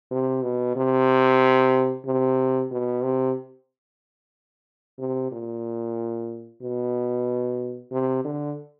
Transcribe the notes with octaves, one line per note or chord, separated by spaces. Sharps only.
C3
B2
C3
C3
B2
C3
C3
A#2
B2
C3
D3